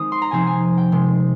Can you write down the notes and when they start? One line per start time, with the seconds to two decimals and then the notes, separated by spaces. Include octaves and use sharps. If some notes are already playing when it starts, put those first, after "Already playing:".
Already playing: D#3 G#3 C4 D#6
0.12 C6
0.22 A#5
0.31 C3 F3 C4 D#4 G#5
0.47 G#5
0.78 G5
0.92 C3 D#3 G#3